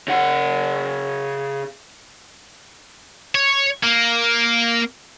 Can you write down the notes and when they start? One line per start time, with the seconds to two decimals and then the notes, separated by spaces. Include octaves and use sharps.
0.08 C#3 F#5
3.35 C#5
3.83 A#3